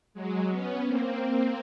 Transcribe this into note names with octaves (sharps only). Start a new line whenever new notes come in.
F#3 G#3
B3 C#4
A#3 C4